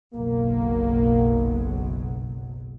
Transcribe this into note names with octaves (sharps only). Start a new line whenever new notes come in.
F#1 B1 F#3 A#3